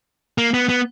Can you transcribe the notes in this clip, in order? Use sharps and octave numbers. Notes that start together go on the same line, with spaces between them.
A#3
B3
B3